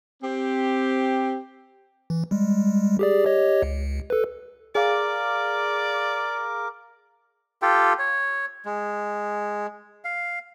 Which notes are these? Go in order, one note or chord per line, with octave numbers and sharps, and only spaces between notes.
C4 G4
E3
G3 G#3
G4 G#4 D5
G4 C#5 D#5
C#2
A4 B4
G#4 A#4 D5 F5 D6
F4 G4 A4 G5
C#5
G#3
F5